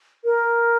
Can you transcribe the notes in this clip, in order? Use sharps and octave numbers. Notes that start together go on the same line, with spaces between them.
A#4